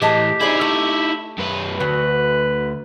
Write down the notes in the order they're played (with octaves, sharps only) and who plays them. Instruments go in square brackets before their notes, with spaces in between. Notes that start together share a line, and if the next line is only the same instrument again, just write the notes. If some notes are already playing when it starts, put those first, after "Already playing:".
[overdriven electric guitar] A2 E3 [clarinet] G4 [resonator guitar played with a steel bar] G#4 D#5 A5
[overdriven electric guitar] D#4 E4 [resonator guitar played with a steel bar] G#4 C5 D5
[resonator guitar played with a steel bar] A3
[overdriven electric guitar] F#2 B4
[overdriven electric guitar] D2 [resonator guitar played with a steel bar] F#4 [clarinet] B4